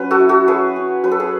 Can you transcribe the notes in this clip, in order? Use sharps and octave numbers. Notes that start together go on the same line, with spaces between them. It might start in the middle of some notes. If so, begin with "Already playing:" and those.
Already playing: F#3 C#4 B4
F#4 A4
E4
F#4 A4
F#3 G#4 B4
C#4
F#3 B4
A4
G#4 B4